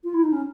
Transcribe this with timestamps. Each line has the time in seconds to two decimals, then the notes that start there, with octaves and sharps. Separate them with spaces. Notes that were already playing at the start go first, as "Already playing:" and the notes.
0.04 F4
0.14 E4
0.23 D#4
0.32 C#4